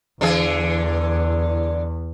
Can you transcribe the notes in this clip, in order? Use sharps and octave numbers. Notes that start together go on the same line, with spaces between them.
E2 D3 E3 G#4